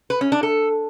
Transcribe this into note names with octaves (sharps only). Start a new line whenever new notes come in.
B4
C#4
D4
A4